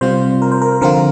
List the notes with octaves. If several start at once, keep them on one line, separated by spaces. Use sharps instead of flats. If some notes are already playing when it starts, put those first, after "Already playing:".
C3 G3 C4 F4 C5
A#4
C5
A#4
D3 F3 C4 F4 A#4